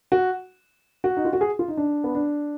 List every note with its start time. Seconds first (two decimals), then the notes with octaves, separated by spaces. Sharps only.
0.12 F#4
1.04 F#4
1.17 D#4
1.25 F4
1.33 F#4
1.41 G#4
1.59 F4
1.68 D#4
1.77 D4
2.04 B3
2.15 D4